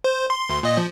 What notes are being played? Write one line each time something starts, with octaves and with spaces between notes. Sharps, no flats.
C5
C6
D2 C6
A#2 D#5
F3